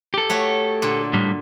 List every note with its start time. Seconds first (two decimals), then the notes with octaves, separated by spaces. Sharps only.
0.14 G4 A4
0.30 A3 F#4 C#5
0.82 A#2 D3
1.13 A2 G3